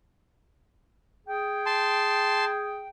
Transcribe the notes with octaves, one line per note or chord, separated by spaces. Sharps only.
G#4 G5
A5 C6